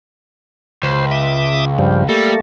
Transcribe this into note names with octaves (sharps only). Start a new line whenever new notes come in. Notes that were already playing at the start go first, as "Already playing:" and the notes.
C#2 C5
E5 D6 D#6
G2 F3 G3
G3 A3 A#3 A4